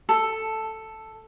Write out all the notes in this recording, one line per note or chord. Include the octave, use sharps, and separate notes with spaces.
A4